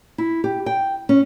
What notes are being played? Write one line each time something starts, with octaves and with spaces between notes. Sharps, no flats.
E4
G4
G5
C#4